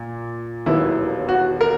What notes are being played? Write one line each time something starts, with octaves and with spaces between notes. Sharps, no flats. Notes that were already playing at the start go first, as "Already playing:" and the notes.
Already playing: A#2
E1 D#2 D#3 F#3 B3 E4
F#4
A#4